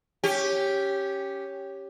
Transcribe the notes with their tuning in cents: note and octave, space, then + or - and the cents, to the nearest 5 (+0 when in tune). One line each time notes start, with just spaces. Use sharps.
C#4 +0 G4 +0